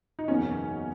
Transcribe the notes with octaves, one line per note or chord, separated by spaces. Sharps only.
D#4
F#1 E2 B2 C#4